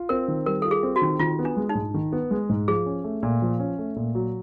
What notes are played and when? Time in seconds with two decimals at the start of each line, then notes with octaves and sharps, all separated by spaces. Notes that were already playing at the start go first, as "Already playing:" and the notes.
Already playing: F4
0.09 C4 A#4
0.28 D#3
0.46 G3 A#4
0.62 F4 A4
0.71 G#4
0.83 C4
0.96 F#4
1.02 D#3
1.19 D#3 F4
1.39 B3
1.45 D4
1.57 G#3
1.69 D#4
1.75 G#2
1.94 D#3
2.13 B3
2.31 G#3
2.49 G#2
2.68 F3 G#4
2.86 C#4
3.04 A3
3.23 A#2
3.42 F3
3.60 C#4
3.78 A3
3.96 A#2
4.15 F#3